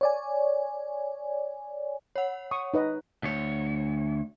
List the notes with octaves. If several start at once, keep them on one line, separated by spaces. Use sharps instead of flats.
C#5 D5 G#5
C#5 F#5
C#6 D#6
D#4 B4 D#5
D2 C#5